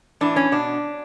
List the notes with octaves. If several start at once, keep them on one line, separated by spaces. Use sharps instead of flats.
A2 E3 D4
C#4
B2 D4